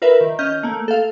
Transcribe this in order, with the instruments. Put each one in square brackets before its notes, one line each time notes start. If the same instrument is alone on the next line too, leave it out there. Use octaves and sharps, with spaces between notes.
[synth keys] F4 A#4 B4 E5
D#3
C#4 D#5 F6 G6
A3 A#3
A4 F5